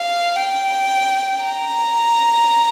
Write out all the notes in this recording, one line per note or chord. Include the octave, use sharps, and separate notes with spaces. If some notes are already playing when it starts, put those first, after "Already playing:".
Already playing: F5
G5
A#5